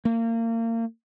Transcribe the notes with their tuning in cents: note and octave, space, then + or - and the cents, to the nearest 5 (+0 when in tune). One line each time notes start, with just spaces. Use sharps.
A#3 -30